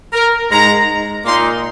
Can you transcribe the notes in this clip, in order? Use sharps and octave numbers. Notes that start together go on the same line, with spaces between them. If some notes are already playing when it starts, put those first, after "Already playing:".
A#4
G#2 G#3 D#4 A#5
A#2 A#3 D#4 C6